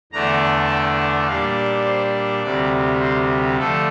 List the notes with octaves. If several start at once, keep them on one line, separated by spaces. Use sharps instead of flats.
E2 D3 A3 D4 A#5
G5
A#2 G3 D4 F5
C5
D2 C3 G3 D5
C5
D3 F3 A3 A4